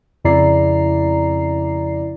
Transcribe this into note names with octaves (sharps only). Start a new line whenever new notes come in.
F2 C#3 E4 D5 A#5 C7